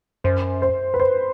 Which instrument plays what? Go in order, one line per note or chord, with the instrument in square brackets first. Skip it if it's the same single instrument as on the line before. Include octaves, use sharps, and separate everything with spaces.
[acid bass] F#2 [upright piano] C5
[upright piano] C5
B4
C5